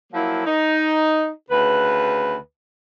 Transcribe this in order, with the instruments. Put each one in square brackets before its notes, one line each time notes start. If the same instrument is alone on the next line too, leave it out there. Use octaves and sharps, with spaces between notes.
[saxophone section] F3 F#3 A#3 E4
D#4
D2 C#3 B4